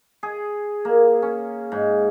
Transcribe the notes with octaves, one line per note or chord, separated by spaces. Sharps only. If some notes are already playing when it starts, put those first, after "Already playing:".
G#4
A#3
C#4
G#2